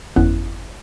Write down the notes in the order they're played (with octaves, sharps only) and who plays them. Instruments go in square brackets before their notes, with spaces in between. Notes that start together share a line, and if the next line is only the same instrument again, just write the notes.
[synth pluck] G1 F2 B3 C#4 E4 F#6